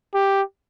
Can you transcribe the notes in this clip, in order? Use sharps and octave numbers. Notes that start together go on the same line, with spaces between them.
G4